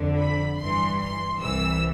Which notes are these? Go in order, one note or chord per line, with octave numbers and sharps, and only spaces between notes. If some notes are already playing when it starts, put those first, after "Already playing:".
Already playing: F2 D3
B5
G2 E3 C6
C6
C2 C3 E3 E6